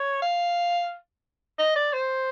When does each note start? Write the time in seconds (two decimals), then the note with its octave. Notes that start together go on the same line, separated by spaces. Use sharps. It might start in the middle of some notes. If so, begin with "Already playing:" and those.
Already playing: C#5
0.22 F5
1.59 D#5
1.76 D5
1.93 C5